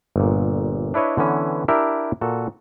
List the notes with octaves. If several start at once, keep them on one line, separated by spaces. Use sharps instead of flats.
G1 A#2
D4 E4 B4 C#5 D#5
D3 E3 B3 C#4
D4 E4 G4 A#4 E5
A#2 F#4 A4